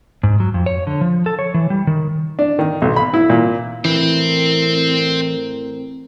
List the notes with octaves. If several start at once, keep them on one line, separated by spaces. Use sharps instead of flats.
G#2
F#3
F2
C#5
D3
F3
A4
C#5
E3
G3
D#3
D4
D#3
B1
B5
E4
A#2
A2 E3 C4 A#4 C5 G5